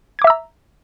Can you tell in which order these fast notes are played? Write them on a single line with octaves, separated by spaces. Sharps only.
G#6 D6 E5 E6 A#5